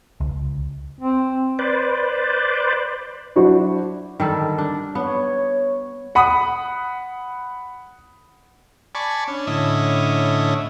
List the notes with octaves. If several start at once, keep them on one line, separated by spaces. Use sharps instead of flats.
C#2
C4
B4 C5 D5
F#3 D4 E4 F#4 C5 D5
D3 D#3 G3 A4
D4
B3 C#5
F#5 B5 D#6
D5 G#5 A5 B5 C#6
C#4 D4
A2 D3 C#4 E4 D#5